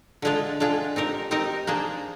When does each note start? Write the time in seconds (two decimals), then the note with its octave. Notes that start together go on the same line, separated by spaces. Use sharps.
0.22 D3 G#3 D4 F4 G#4
0.60 D3 G#3 D4 F4 G#4
0.96 C4 D#4 G4 A#4 D#5
1.31 C4 D#4 G4 A#4 D#5
1.67 A#3 D4 G#4 C5